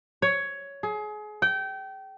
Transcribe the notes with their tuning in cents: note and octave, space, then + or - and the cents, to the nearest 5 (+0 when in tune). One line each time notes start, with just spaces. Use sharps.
C#5 +10
G#4 +30
G5 -25